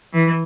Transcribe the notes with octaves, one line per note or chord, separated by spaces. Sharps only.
E3